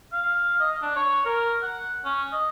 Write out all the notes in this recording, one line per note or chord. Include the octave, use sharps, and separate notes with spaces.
F5
D#5
D4
C#5
A#4
F#5
C#4
D#5